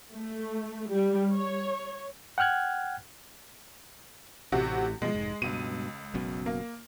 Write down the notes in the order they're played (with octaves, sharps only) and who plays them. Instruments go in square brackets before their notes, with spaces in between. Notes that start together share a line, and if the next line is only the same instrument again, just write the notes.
[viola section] A3
G3
C#5
[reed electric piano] F#5 G5 F6 F#6 G#6
[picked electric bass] A1 A2 [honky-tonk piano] C3 F#4
[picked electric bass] B2 F3 [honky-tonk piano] G#3
[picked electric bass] F1 G#2
[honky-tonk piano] C#2 D#7 [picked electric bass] G2 B2
[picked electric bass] F#1 F#2 B2
[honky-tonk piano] A#3